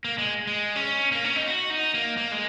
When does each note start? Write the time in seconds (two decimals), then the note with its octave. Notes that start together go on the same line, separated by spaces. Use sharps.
0.04 A#3
0.18 G#3
0.47 G#3
0.76 C#4
1.12 A#3
1.24 C#4
1.36 D#4
1.47 F#4
1.70 D#4
1.94 A#3
2.17 A#3
2.32 G#3